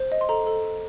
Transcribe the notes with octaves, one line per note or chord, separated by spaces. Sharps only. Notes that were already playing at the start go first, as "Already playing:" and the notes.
Already playing: C5
D#5
C6
A4 A#5
A4
A4